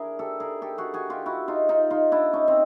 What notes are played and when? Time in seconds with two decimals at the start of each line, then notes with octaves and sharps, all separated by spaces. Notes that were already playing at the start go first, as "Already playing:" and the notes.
Already playing: D4 E4 G#4 A#4
0.19 G4 A4
0.40 G#4 A#4
0.62 G4 A4
0.78 F#4 G#4
0.94 F#4 G#4
1.10 F4 G4
1.26 E4 F#4
1.48 D#4 F4
1.69 D#4 F4
1.91 D#4 F4
2.12 D4 E4
2.33 C#4 D#4
2.48 C4